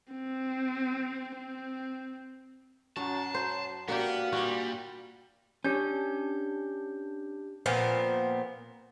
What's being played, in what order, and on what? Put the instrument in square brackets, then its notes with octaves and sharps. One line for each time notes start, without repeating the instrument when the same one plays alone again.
[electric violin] C4
C4
[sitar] F#2 [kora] F#4 [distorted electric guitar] A5
[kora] C5
[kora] A#3 D4 G4 [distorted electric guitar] B3 [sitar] F#4 [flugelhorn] F5
[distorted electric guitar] A#2 [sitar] G3 [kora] F#4
[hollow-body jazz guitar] C#4 [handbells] D4 G4 G6
[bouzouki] A#2 F3 B3 C4